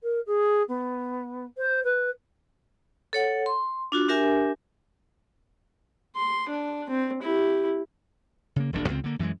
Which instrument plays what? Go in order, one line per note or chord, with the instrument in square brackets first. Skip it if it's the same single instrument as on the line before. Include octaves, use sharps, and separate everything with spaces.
[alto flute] A#4
G#4
B3
C5
B4
[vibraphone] A4 C#5 F#5
C6
D4 F4 F#4
D4 G4 A#4 E5 G#5
[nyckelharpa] C6
D4
C4
E4 G4
[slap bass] C#3 A#3
E1 A#1 C3 D4
C#2 C#3 C4
D3 A#3
F#2 E3 F#3 G#3